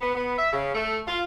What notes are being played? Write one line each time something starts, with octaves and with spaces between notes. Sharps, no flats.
B3
B3
E5
C#3
A3
F4